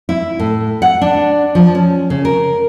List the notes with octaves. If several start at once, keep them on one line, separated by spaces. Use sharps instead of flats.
E4
A2
F#5
D4
F3
C#4
C#3
A#4